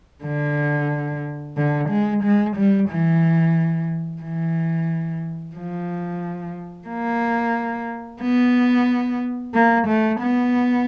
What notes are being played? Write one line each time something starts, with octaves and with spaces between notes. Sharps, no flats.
D3
D3
G#3
G#3
G3
E3
E3
F3
A#3
B3
A#3
A3
B3